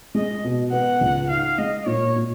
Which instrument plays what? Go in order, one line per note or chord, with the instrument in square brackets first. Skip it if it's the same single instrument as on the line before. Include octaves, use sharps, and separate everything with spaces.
[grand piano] G#3 [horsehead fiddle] D#5
[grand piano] B2
[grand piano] B3 [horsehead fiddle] F#5
[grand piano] C#2
[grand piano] D#4 [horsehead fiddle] F5
[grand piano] G#3 [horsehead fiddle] D#5
[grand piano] A#2 [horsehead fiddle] C#5
[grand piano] A#2